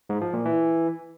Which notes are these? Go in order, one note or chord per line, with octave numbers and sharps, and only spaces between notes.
G#2
F3
A#2
E3